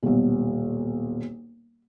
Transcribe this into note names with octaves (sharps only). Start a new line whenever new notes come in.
D#1 B1